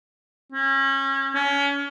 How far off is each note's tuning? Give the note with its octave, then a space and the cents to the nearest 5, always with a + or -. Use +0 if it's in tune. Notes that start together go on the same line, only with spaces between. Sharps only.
C#4 -30
C#4 +30